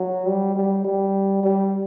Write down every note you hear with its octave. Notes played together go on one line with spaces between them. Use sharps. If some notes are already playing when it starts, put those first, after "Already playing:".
Already playing: F#3
G3
G3
G3
G3